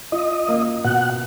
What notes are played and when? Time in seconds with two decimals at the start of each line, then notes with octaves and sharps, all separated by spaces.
0.12 F4 D#5
0.48 A#3
0.84 B2 F#5